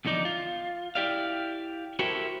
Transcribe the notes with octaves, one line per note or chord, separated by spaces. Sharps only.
E2 D3 F3 D#4 D5
F4
E4 G4 D5 F5
E4 F#4 G4 A4 A#4 C5